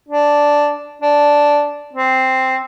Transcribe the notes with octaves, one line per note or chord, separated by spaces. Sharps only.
D4
D4
C4